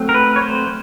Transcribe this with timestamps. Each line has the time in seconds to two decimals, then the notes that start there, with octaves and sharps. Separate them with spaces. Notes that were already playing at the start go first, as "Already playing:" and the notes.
Already playing: F#3 A3 C4
0.09 A#4
0.14 B4
0.36 C#5
0.42 C5